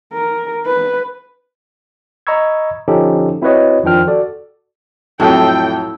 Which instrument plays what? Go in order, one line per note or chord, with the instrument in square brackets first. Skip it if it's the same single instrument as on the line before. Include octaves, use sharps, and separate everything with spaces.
[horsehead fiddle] A#4
B4
[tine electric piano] D#5 A#5 B5 C#6 E6 G#6
D3 F3 C#4 D#4 G4 A4
C4 E4 F#4 B4 C#5 D#5
F2 D#3 F3 D4 G5 F6
F#4 A4 D5
[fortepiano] F2 A2 F#3 [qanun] E4 [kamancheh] G5